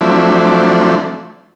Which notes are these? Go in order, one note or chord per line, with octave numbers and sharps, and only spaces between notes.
F3 F#3 A3 C4 D4 E4